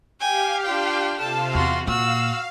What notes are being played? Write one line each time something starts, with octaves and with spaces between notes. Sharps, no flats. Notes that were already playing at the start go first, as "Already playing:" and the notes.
G4 F5 G5 G#5
D4 F4 G5
C3 F4 A4 F5 A5
E2 F#4 C6
A#2 F#4 F5 E6